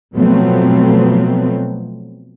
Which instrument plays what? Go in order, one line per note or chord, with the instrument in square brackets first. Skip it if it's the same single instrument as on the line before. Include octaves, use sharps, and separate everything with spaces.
[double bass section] B2 F3 F#3 A3 B3 C4